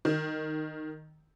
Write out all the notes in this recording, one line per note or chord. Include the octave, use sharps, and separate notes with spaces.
D#3